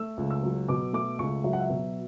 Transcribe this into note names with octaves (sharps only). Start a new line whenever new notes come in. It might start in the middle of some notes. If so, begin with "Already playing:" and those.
Already playing: A3 E6
C#2
E6
F#3
B2 D6
A3 D6
C#2 C#6
F#3 E5
F#5
E5
B2